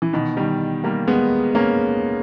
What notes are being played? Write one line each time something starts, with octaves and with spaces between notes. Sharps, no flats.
E3
B2 D#3
D#3 G3
G3 A#3
G#3 B3
A#3 C#4